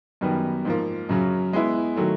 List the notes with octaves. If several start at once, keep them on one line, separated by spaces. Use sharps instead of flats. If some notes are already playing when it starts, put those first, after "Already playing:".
F#2 D#3 G3 B3
G#2 F3 A#3
F#2 C#3 F#3
G#3 B3 E4
D#3 F#3 A3